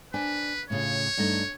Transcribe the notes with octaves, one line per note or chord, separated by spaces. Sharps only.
D4 B4 C5 G#5
A2 C#3 F4 C#5
G2 A3 D#4